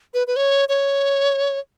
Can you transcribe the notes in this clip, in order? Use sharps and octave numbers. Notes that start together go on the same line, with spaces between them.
B4
B4
C#5
C#5